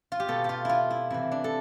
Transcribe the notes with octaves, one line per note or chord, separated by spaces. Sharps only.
F4
G4
B2 A4
F4 G4
E4 F4
E4
C3 E3 E4
D4
A4